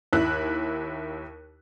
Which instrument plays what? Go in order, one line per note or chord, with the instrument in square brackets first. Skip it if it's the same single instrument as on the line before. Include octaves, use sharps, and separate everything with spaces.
[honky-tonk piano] D#2 E4 F#6